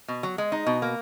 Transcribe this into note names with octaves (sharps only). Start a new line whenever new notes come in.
B2
F#3
G#3
D#4
B2
A#3